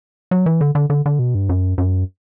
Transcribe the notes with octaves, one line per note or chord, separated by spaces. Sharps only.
F#3
E3
D3
D3
D3
D3
B2
G2
F#2
F#2